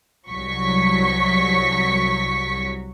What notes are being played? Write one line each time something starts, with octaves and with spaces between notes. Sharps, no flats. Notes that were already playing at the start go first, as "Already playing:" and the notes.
C2 F#3 C#6 B6